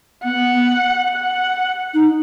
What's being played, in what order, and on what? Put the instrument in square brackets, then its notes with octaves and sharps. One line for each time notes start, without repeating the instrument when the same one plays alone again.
[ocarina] B3 [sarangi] F#5
[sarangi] F#5
[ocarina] D#4